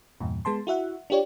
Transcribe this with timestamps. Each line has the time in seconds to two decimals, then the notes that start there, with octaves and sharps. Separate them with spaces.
0.21 E2 G2 A#2
0.45 G#3 B3 A5 C6
0.67 E4 F#4 E5 F#5
1.10 D4 F4 G4 C#5 D5